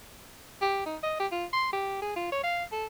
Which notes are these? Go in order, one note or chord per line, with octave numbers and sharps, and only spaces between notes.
G4
D#4
D#5
G4
F4
C6
G4
G#4
F4
C#5
F5
A4